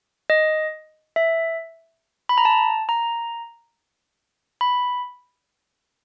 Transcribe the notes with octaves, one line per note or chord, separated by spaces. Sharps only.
D#5
E5
B5
A#5
A5
A#5
B5